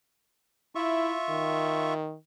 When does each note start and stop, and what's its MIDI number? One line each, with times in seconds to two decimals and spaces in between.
0.75 1.14 64
0.75 1.94 65
0.75 1.94 76
0.75 1.94 85
1.29 2.15 51